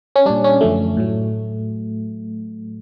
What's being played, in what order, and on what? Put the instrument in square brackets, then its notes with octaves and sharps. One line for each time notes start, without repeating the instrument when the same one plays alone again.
[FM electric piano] C#4
A#2 G3 D4
C#4
F#2 D3 F3 A3
A2 F#3